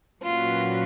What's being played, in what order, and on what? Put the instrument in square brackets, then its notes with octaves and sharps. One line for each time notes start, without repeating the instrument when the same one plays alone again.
[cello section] A#2 F#3 C#4 F#4 B4 [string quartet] F4